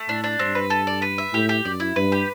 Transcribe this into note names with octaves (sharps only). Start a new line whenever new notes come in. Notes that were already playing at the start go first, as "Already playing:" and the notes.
Already playing: A3
A2 D4
D4
G2 C4
B4
A4
D5
B4
E5
A2 G4
G4
F#2 D5
E4
G2 B4
G4